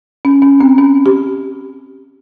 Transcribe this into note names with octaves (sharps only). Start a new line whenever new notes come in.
C#4
C#4
C4
C#4
G4